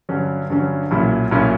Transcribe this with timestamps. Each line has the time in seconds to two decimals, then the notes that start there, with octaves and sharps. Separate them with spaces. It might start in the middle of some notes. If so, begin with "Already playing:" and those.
0.09 G2 D3 F#3 C#4
0.50 G2 D3 F#3 C#4
0.91 B1 A#2 F#3 C#4 E4
1.31 B1 A#2 F#3 C#4 E4